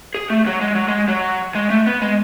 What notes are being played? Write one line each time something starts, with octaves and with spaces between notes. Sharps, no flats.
G#4
A3
F#3
G#3
F#3
G#3
F#3
G#3
A3
B3
G#3